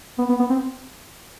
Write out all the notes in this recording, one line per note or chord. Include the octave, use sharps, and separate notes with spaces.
B3
B3
B3
C4